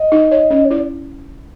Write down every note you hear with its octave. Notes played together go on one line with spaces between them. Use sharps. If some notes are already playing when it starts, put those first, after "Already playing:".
Already playing: D#5
D#4
C#5
C#4
C#5
E4 D5